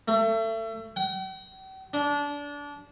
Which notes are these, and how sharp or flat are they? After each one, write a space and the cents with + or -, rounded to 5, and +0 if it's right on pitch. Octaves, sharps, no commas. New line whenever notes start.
A3 +30
G5 -45
D4 -25